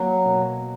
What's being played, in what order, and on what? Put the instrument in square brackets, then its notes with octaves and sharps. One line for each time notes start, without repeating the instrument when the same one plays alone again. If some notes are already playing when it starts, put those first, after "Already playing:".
Already playing: [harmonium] F#3 [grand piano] A#3
[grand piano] B2